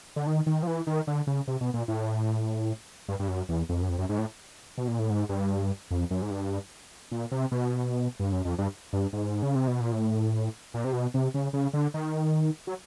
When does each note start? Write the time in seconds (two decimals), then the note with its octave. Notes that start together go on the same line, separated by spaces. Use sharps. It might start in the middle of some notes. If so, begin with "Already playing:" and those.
0.16 D3
0.27 D#3
0.46 D#3
0.63 F3
0.67 E3
0.87 D#3
1.07 D3
1.27 C#3
1.48 C3
1.61 B2
1.74 A#2
1.88 A2
3.08 G2
3.19 G2
3.28 F#2
3.49 E2
3.69 F2
3.82 F#2
3.89 F2
3.98 F#2
4.09 G#2
4.19 A2
4.78 B2
4.88 A#2
4.99 A2
5.10 G#2
5.29 G2
5.91 F2
6.11 F#2
6.22 G#2
6.31 G2
7.12 A#2
7.32 C3
7.52 B2
8.20 G2
8.32 F#2
8.45 F2
8.58 G2
8.93 G2
9.13 G#2
9.43 C#3
9.55 C3
9.68 B2
9.80 A#2
9.92 A2
10.74 A#2
10.84 C3
10.93 B2
11.14 C3
11.34 C#3
11.53 C#3
11.73 D3
11.94 D#3
12.67 F#3